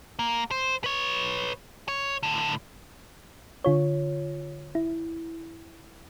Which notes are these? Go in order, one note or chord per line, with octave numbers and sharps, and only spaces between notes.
A#3
C5
B4 C#5
C#5
A2 D3
D3 F4 C#5
E4